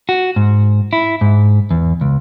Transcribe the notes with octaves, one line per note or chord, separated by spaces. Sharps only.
F#4
G#2
E4
G#2
E2
C#2